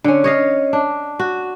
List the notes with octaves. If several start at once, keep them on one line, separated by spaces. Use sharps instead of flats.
D3 C#4
C#5 D#5 F5
D4
F#4